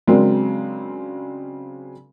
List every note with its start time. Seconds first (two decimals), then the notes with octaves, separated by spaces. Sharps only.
0.07 C#3 F#3 G#3 C4 D4 A#4